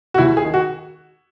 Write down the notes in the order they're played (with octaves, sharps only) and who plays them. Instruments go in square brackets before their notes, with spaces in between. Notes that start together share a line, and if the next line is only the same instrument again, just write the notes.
[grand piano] F#4
D#2 E4
G#4
D#3
F#4